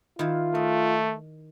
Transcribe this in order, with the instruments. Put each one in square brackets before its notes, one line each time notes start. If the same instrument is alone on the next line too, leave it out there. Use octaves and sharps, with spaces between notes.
[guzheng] D#3 E4 [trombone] F4
[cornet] A3 [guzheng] D#5